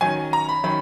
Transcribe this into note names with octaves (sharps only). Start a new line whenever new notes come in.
D#3 F#3 C#4 G#5
A#5
B5
D#3 F#3 C#4 B5